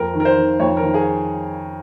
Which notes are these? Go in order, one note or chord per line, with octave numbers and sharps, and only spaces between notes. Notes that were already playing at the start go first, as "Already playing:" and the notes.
Already playing: F2 A#4
D#3
A#4
C5
D#3
F2 C#5
A#4
D#3
G#4